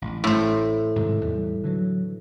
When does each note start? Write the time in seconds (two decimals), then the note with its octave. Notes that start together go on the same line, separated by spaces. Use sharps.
0.02 A1
0.24 A2 C5
0.96 G#2 C3 D#3
1.21 E2 G3
1.64 D3 E3 F#3